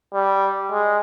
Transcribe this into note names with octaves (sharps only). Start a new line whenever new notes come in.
G3
G#3